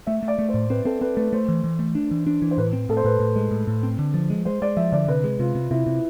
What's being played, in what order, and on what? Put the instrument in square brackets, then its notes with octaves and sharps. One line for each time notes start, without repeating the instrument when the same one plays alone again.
[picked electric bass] A3 [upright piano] E5
[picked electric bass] A3
[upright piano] D5
[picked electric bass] A3
[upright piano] C5
[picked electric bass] A2
[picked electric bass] C4 [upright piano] B4
[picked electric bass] C4 [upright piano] A4
[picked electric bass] C4 [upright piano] B4
[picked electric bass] A3 [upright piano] B4
[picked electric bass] A3 [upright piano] C5
[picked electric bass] E3
E3
A3
D4
E3
D4
E3
[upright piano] C5
[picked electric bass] A2 [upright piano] B4
[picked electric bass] C4
[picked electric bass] A2 [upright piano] A4
[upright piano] C5
[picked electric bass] A2 [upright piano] B4
[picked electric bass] A2
G#3
A2
A2
C4
D3
F3
G#3
[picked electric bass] G#3 [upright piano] C5
[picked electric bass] G#3 [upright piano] D5
[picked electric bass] F3 [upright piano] E5
[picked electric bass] D3 [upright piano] D5
[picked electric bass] C3 [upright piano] B4
[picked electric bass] G#3
[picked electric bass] C3 [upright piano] F4
[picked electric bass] C3
[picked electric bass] C3 [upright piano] E4
[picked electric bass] C3